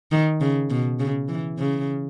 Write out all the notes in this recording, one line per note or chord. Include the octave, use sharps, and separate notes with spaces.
D#3
C#3
B2
C#3
E3
C#3